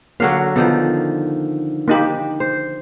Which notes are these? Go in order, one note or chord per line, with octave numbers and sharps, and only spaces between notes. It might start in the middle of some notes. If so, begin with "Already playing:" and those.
D3 F#3 A#3 F#4 F5
D3 D#3 F3 B3
A#3 D#4 G4
C5